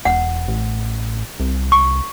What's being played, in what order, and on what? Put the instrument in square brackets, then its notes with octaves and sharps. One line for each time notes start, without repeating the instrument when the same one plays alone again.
[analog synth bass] E1 [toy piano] F#5
[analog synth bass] A1
C2
[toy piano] C#6